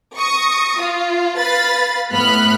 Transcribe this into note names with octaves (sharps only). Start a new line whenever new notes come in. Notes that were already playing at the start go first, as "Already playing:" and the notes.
C#6 D#6 A#6
F4
B4 F5 B5 A6
A2 B3 B5 F6 F#6